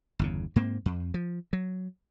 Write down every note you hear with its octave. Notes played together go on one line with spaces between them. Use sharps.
G1 E2 C#3
G#2 A#3 C4
F2
F3
F#3